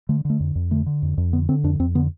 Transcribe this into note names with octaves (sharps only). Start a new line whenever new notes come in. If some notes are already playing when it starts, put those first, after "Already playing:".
D3 A3
D3 A3
F2
F2
D3 A3
D3
F2
F2
D3 B3
D3 C4
F2 D4
F2 C4
D3 B3